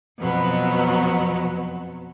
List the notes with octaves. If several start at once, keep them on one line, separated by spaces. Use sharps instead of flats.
F2 B2 F#3 B3